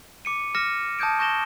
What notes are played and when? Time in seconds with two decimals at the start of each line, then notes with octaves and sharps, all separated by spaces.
0.25 D6 C#7 D#7
0.55 D6 F6 A#6 C#7 E7
0.99 A5 D#6 G6 G#6 D7
1.19 C#6 G6 A#6 E7 G7